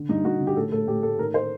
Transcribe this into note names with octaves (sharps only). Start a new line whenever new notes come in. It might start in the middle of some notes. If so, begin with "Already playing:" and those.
Already playing: D3
G2 D#4
G2 F#4
D3
G4
A2 A4
A2 A4
A2 G4
A2 A4
D#3 A#4
C5